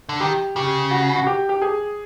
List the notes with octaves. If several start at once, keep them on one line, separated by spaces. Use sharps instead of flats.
D3
D#3 G4
C#3 G4
F#4
F#4
G4
G4
G#4